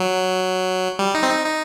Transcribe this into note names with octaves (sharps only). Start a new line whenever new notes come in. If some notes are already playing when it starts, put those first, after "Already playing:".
Already playing: F#3
G3
D#4
C4
D#4
D#4